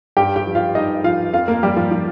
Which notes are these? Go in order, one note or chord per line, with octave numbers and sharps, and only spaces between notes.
G2 G4 G5
G4 G5
F3
F4 F5
G2 D#4 D#5
F3 F4 F5
F2 F4 F5
A#3 A#4
F3 G3 G4
F3 F4
F3 F4